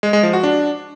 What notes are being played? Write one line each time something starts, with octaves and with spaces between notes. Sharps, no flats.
G#3
G#3
F3
F#4
D4